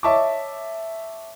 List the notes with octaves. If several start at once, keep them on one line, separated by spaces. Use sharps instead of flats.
C#5 D#5 E5 A5 C#6 D6